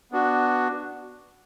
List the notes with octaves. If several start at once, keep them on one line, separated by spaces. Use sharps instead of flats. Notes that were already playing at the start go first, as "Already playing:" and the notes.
B3 D4 F#4